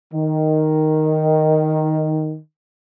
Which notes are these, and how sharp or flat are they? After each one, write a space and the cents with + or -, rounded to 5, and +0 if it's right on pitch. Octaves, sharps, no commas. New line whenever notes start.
D#3 +0